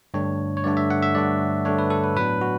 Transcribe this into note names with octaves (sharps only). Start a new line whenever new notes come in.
G2 D3 A3 D4 C#5
C#5
G2 D3 A3 D4 D5
E5
F#5
E5
G2 D3 A3 D4 D5
G2 D3 A3 D4 C#5
B4
A4
B4
A2 F#3 B3 D4 B4
F#4